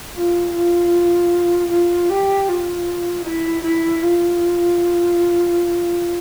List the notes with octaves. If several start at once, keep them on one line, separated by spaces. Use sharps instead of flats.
F4
F4
F4
G4
F4
E4
E4
F4